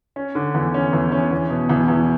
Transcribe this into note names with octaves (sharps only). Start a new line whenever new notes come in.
C#4
D3
E2
C#4
E2
C#4
E2
B2
E2
E2